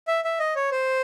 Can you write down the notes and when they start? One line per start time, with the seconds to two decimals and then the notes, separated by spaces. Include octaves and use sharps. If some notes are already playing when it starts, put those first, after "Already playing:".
0.08 E5
0.24 E5
0.39 D#5
0.55 C#5
0.71 C5